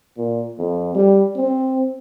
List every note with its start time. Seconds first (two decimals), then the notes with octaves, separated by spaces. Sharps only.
0.17 A#2
0.58 F2
0.95 G3
1.37 C4